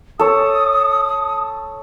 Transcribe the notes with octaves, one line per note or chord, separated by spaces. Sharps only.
A4 C#5 D#6